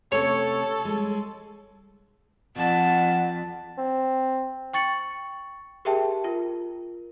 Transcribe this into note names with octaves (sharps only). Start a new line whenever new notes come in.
C3 A3 C#4 A4 C#5
G3 G#3
F2 F#5 A5
C4
G5 C#6 A6 C#7 F#7
G4 G#4 A#4 E5 G5 A5
F4 A#4